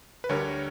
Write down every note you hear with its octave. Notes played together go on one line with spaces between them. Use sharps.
B4
D2 D3 G3 A#4 C#5